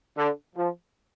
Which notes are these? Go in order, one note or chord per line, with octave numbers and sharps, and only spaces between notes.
D3
F3